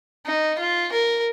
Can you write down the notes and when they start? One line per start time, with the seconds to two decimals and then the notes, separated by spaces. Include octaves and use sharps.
0.26 D#4
0.59 F4
0.92 A#4